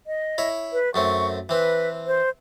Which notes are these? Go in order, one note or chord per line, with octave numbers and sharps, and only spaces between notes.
D#5
E4 C#5
B4
F#2 A3 C4 C#6
E3 C4 B4
C5